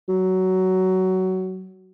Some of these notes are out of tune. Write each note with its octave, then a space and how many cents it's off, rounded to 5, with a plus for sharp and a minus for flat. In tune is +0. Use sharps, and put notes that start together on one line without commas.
F#3 +15